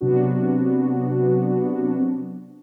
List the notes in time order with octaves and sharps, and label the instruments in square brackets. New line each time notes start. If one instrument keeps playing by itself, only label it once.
[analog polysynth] C3 F#3 B3 D4 F#4